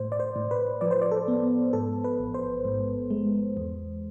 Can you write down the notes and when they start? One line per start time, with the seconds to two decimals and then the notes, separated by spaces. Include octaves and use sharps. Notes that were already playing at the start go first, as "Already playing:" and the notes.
Already playing: A2 C5
0.12 D5
0.20 C5
0.36 A2
0.51 B4
0.81 F3 D5
0.91 C5
1.02 D5
1.11 A4
1.28 B3
1.73 G#2 A4
2.04 B4
2.19 A1
2.34 C5
2.65 G#2
3.11 G#3
3.57 E2